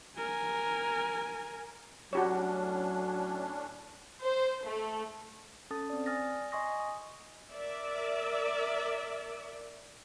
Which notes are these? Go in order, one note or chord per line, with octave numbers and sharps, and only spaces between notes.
A#4 G#5
A2 F#3 C#4 D4 F#4 G4 C#5
C5
A3
C#4 A4 A5 D#6 A6
C4 D5
D5 G#5 D#6 F6 A6 A#6
D#5 G#5 C6 C#6 D#6 A#6
D#6
A#4 D5 E5